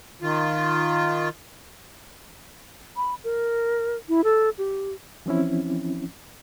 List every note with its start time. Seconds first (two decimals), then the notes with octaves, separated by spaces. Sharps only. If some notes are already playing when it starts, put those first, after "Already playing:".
0.22 D#3 F4
2.96 B5
3.24 A#4
4.09 E4
4.24 A4
4.58 G4
5.26 E3 F3 C4 C#4 E4